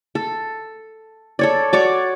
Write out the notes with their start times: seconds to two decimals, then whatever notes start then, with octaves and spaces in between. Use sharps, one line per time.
0.15 A4
1.39 A4 C#5 D5
1.73 F#4 C#5 D5 D6